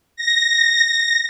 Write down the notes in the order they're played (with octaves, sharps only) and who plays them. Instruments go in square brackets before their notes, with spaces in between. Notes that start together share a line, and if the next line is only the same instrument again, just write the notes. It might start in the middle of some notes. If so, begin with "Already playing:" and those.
[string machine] A#6